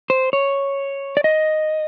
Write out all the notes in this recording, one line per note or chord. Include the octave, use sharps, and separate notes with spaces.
C5
C#5
D5
D#5